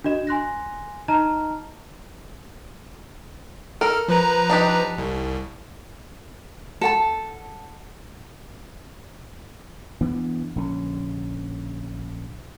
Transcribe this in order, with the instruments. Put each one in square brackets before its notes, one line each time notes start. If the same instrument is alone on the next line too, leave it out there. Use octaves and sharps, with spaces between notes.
[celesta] D4 F#4 D#5 E7
G#5 C6 F#6 A#6
D#4 D#5 A5 A#5 F6
[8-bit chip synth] A4 F6 [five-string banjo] A#4
[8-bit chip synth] F3 B4 A#5
[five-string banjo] D4 D#4 G4
[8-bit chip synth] C2
[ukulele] A4 F#5 A5
[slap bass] E3 B3 D4
A#1 D3 C#4